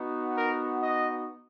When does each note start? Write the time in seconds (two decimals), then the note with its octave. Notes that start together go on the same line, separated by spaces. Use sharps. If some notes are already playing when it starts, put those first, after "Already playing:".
Already playing: B3 D#4 F#4
0.37 A#4
0.81 D#5